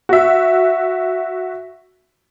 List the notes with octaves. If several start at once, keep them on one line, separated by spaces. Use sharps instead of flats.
F#4 E5